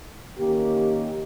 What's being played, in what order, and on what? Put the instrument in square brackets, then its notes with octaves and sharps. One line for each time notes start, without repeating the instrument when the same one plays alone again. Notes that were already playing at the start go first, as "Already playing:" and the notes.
[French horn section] D#3 A#3 C#4 G4